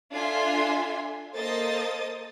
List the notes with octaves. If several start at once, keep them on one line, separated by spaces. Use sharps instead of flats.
D4 F4 A4 E5 G#5 C6
A#3 A4 C5 D#5 D#6 A6